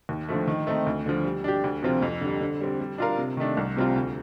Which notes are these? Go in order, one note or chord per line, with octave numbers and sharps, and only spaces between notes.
D#2
D3 F3 A3
D#3
A3 C4 D#4
D2
D3 F3
G3
D4 G4
D2
C3 F3 C4 F4
F2
D3 G3
D3
G3 C4
G3
D4 F4 A#4 F5
C3
D#3 A3 D4
C2
C3 G3 C4 F4
D2